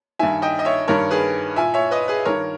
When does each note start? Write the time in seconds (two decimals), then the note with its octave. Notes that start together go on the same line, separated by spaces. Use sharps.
0.19 G2 D#3 E5 G#5
0.42 D#5 G5
0.59 D#5
0.65 C#5 E5
0.88 G2 D#3 A#4 C#5
1.11 G#4 B4
1.56 A#2 E5 G#5
1.74 C#5 E5
1.91 B4 D#5
2.08 G#4 B4
2.25 G2 D#3 A#4 C#5